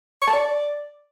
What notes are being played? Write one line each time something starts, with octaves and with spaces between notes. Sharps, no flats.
C#6
A5
D5